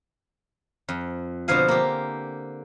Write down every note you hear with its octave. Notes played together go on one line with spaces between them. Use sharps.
F2
B2 D3 F3 C5 F5 G#5
A#3 G4